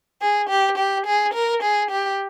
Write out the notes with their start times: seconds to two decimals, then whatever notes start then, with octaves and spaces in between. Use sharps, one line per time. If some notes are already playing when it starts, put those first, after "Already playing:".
0.22 G#4
0.49 G4
0.78 G4
1.06 G#4
1.34 A#4
1.63 G#4
1.91 G4